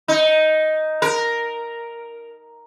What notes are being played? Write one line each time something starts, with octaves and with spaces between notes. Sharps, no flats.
D#4
A#4